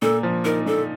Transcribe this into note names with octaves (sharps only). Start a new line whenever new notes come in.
A#2 A4
F3
D#4 A#4
A#2 A4